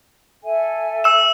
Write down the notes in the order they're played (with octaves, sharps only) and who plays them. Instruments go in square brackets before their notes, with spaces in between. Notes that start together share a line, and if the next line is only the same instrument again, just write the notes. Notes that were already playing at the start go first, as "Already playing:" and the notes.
[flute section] A4 E5 G#5
[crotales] E6 E7